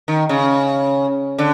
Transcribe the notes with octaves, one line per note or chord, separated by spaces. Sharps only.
D#3
C#3
D3